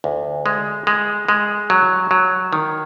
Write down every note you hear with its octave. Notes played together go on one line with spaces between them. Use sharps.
D2
G#3
G#3
G#3
F#3
F#3
D#3